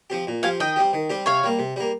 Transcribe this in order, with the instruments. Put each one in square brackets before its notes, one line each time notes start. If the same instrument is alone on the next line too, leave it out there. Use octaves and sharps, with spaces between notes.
[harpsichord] F3 C4 G4
A#2
[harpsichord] F3 C4 G4 [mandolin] F5 G#5
[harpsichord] D#3 [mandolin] D#5 G5
[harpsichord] G3 C4 G4
D#3
G3 C4 G4
[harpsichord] C3 [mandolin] C#5 F5
[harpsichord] G3 A#3
C3
G3 A#3